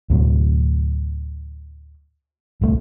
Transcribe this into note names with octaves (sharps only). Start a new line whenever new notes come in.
D2 A2 C3 F#3
D1 C2 A3